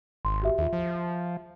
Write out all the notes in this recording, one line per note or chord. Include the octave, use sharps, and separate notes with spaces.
G#1 C6
F#4 G4 E5
D#2 F4 G#4 E5
F3